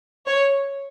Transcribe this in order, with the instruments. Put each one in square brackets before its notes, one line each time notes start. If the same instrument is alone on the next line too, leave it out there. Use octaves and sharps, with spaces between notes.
[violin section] C#5